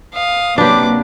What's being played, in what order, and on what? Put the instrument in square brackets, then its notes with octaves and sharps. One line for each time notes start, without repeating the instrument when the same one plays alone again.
[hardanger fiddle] F5 D#6
[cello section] C3 F#3 A#3 [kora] D4 G4 [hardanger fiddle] B4 D6